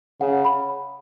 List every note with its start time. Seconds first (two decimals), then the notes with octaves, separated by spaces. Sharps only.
0.21 C#3 F#5
0.45 B5